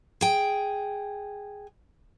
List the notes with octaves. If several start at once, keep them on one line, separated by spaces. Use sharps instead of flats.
G#4 G5